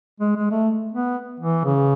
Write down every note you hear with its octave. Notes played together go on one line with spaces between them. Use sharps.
G#3
G#3
A3
B3
E3
C#3